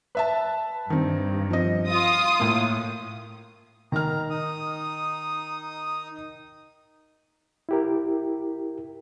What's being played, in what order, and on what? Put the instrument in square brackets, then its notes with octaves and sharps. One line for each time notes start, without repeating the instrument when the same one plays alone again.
[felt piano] B4 E5 A5
[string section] G2 [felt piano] D#3 C4
[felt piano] F3 C4 D#5
[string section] F4 D#6
[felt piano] A2 A#3
[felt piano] D#3 F6 [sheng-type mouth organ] A#5
[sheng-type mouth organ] D#4 D#6
[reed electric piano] E4 G4 A#4